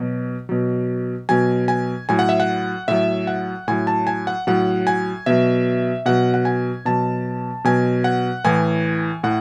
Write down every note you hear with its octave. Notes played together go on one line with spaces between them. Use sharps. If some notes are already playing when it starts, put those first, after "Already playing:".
Already playing: B2 F#3
B2 F#3
B2 F#3 G#5
G#5
A2 F#3 G#5
F#5
E5
F#5
A2 F#3 E5
F#5
A2 F#3 G#5
A5
G#5
F#5
A2 F#3 F#5
G#5
B2 F#3 E5
B2 F#3 F#5
F#5
G#5
B2 F#3 A5
B2 F#3 G#5
F#5
A2 E3 G#5
A2 F#5